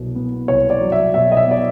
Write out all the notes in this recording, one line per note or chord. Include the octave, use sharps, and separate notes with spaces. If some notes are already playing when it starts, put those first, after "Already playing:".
Already playing: C2 B2 F#3
B3
C2 C#5
D5
F#3
E5
B2 E5
D#5
E5
B3 D5